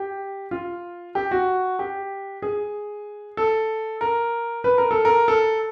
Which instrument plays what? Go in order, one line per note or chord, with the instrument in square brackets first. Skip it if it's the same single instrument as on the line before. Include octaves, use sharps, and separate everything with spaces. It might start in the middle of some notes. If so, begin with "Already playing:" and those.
Already playing: [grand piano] G4
F4
G4
F#4
G4
G#4
A4
A#4
B4
A#4
A4
A#4
A4